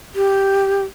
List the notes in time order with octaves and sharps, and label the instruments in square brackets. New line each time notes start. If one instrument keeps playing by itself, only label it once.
[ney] G4